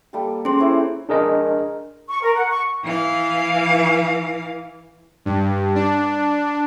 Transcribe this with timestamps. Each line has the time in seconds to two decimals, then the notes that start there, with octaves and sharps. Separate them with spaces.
0.13 G3 A#3 A4
0.45 C#4 G#4 C5
0.59 E4 C5 C#5
1.09 D4 G#4 A#4 D#5
2.08 C#6
2.21 A#4
2.35 F#5
2.49 C#6
2.84 E3 F5
5.25 G2
5.75 D4